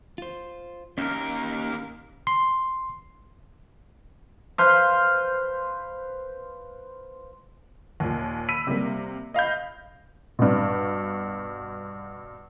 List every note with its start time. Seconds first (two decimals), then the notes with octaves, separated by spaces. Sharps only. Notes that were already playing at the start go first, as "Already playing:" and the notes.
0.18 F4 C5
0.98 D#2 C#4 A#4
2.27 C6
4.58 B4 C5 F5
8.00 D#2 A#2
8.48 B5 E6 B6 D#7
8.67 C3 G3 A#3
9.34 D#5 F5 B5 G6
10.39 G2 B2